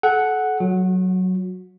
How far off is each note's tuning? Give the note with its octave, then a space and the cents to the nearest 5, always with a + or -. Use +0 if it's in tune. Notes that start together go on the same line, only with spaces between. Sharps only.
A4 -30 F#5 +0
F#3 +0 F#4 -35